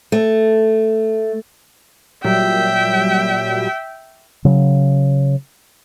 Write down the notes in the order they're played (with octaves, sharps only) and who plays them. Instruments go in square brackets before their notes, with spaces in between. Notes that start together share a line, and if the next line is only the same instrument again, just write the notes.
[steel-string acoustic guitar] A3
[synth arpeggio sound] A#2 F#3 G3 [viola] E5 G5
[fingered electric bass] C#3 F#3